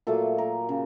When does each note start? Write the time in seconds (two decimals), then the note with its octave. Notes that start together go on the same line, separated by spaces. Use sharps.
0.07 A#2 F#3 A3 A4
0.38 A#4
0.69 C#3